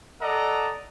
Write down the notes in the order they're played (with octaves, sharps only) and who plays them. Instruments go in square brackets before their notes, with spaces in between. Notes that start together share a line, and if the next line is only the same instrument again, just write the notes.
[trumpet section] A4 D5 D#5 F#5 A#5